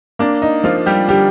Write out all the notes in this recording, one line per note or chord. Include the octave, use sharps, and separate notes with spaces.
A#3 D4
D#4
F3 A#3 F4
G3 G4
D3 G3 G4